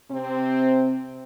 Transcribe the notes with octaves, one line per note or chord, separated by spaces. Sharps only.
C3 C4